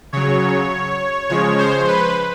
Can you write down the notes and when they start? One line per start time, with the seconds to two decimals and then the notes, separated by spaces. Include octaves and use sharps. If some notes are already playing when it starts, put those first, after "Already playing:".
0.13 C#3 F#3 C#5
1.29 C#3 F3 G#3 C#5
1.59 C5
1.88 B4